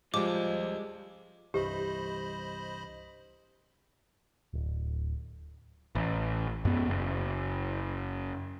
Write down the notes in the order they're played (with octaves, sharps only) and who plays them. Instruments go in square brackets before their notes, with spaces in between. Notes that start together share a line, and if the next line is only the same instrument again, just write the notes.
[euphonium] F3 [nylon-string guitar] G3 G#3 [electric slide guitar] F4 D#5 [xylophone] D6
[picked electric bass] C2 G2 E3 [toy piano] G4 [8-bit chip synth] C5 D#5 B5
[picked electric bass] D1
A1
F#2 B3
F#1